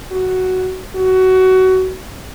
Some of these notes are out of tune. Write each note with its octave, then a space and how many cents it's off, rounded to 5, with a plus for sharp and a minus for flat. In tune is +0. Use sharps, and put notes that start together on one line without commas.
F#4 +5
F#4 +20